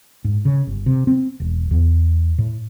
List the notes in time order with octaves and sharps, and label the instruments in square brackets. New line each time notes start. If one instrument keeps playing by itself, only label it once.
[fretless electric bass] G#2
C#3
G1
C3
C4
E1
E2
A2